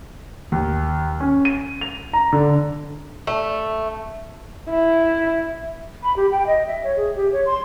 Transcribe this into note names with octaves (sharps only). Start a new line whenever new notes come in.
D#2
C#4
D#7
F7
A#5
D3
A3
E4
B5
G4
G5
D#5
E5
C#5
G#4
G4
C#5
C6